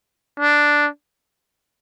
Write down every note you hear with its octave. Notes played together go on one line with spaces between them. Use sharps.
D4